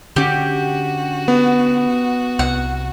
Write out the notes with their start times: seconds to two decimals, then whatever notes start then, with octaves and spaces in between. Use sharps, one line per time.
0.16 D3 C#4 F#4 G4
1.28 B3
2.39 C2 F#5